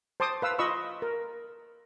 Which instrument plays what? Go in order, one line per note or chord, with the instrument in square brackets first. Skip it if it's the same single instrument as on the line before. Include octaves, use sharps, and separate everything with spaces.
[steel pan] C5 A5 C6 D6 D#6
B4 F5 E6
F4 D#5 B5 C#6 E6
A#4